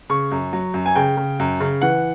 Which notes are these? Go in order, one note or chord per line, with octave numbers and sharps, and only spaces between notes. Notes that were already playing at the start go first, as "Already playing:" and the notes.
C#3 C#6
F#2
F#3
F#2
G#5
C#3 G5
C#3
F#2
C#3
E3 F#5